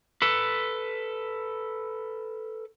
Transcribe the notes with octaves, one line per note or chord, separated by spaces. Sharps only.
A4 B4